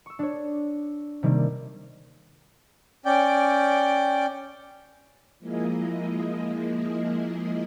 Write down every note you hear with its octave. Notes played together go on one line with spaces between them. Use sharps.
C#6 E6
D4 C#5
C3 D#3 G3 A#3 D4
C#4 D5 G5
F3 G#3 A#3 E4 G#4 D#5